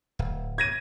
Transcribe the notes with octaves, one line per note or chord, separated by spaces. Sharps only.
D1
G#6 A#6 D#7